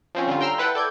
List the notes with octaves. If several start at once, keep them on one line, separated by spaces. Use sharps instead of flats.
F3 C4 C#4
D3 G3 C#4 F4
G5 A#5 C6 E6 F6
E4 B4 F#5 G5 A5
A4 D5 G6 G#6